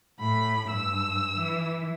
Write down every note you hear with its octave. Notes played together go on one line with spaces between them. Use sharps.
A2 B5
G2 E6
E3